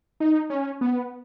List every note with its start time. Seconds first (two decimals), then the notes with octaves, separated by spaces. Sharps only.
0.20 D#4
0.50 C#4
0.81 B3